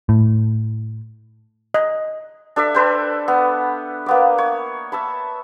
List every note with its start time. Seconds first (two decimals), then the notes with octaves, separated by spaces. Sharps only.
0.09 A2
1.74 D#5
2.56 D4 A4 D5 E5
2.74 A4 B4 C5 G5
3.28 B3
4.06 A#3 B3 D5
4.38 C#5
4.92 E5 A5 B5